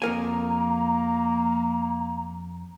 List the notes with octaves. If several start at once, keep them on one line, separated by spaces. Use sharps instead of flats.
F2 A#3 A#4 G#5 A#5